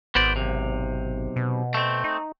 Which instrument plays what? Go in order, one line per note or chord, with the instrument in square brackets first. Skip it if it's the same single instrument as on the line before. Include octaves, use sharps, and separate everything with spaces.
[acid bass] G#1 [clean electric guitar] B3 C5 D5
[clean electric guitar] B1 F#2 C3
[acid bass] B2
[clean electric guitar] A3 C4
[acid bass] D#4